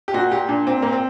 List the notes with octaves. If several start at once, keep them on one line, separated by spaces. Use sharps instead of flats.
G4
A#2 F#4
A#2 G4
A#2 D4
A#2 C4
A#2 A#3
C4